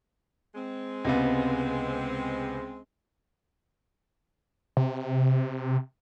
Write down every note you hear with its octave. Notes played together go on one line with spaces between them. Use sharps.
G#3 C4
C#2 C3 B3
C3